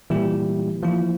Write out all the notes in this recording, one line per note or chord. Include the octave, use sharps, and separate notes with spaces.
A#2 E3 G3 A#3 E4 G4
E3 F3 A#3 E4